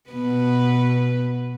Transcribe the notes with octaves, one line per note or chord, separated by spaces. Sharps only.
B2 B3 B4